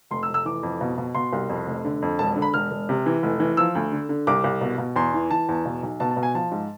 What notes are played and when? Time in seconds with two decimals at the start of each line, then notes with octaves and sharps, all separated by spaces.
0.11 F1 C6
0.23 E6
0.29 F1
0.34 E6
0.45 E3 D6
0.63 F2
0.81 B2
0.98 B2
1.15 B2 C6
1.33 C2
1.49 F2
1.67 F1
1.85 D3
2.02 F2
2.19 E1 A5
2.36 D3
2.42 B5
2.54 E1 F6
2.71 E1
2.89 C3
3.06 E3
3.23 F1
3.40 E3
3.57 F3 E6
3.75 D2
3.92 D3
4.09 D3
4.27 C2 D6
4.44 C2
4.61 B2
4.78 B2
4.96 E2 C6
5.14 E3
5.30 E3 A5
5.49 E2
5.65 B2
5.83 B1
6.00 B2 A5
6.11 A5
6.17 B2
6.23 G#5
6.34 F3 A5
6.51 G#2